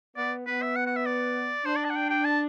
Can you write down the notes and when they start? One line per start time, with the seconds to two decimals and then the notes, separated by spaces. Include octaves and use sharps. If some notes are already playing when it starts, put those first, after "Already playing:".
0.17 B3 D5
0.47 B3 B4
0.62 E5
0.76 F#5
0.86 F#5
0.96 E5
1.06 D5
1.65 D4 C5
1.76 D5
1.85 A5
1.90 F#5
1.95 G5
2.10 G5
2.25 A5